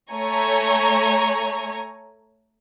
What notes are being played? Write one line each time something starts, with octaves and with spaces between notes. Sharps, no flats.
A3 C#5 G#5 A#5 C#6